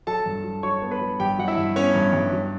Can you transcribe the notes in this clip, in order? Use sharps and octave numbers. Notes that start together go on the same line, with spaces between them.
F#3 A4 A5
G2
F#3
F#3 C#5 C#6
B3
B4 B5
F#3
G2 G4 G5
F#3 F#5
E4 E5
G2
B3 C#4 C#5
G2
G2
F#3